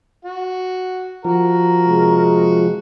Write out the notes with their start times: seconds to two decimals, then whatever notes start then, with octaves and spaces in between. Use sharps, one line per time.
0.25 F#4
1.25 F3 F#4 A#4
1.86 C3 G#3